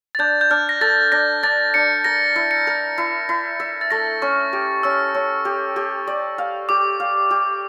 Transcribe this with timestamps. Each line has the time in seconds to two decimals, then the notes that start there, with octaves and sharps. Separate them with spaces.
0.15 A6
0.19 D4 G6
0.41 G6
0.50 D4 F6
0.69 A#6
0.81 A4 A6
1.12 D4 A#6
1.43 D4 A6
1.74 D4 C#7
2.04 A#4 A#6
2.36 E4
2.51 C#7
2.67 A#4
2.98 E4
3.29 E4
3.60 E5
3.81 A6
3.91 A3 A#6
4.22 C#4 C#6
4.53 G4
4.83 C#4 E6
5.14 C#4
5.45 G4
5.76 G4
6.07 D5
6.38 F5
6.69 G4 D6
7.00 F5
7.31 G4